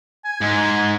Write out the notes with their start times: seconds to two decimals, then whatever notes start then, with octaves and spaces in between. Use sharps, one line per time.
0.25 G#5
0.41 G#2